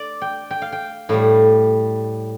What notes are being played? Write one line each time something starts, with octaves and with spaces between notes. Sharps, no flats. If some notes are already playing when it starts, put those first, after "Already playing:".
Already playing: D5
G5
G5
F5
G5
A2 G3 F5